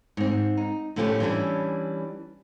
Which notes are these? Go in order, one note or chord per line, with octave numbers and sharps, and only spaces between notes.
G#2 C4
D#4
A2 D3 F3 A3 C#4 G4
E3 G3 C#4 D4 E4